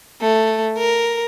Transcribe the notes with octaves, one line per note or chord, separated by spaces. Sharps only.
A3
A#4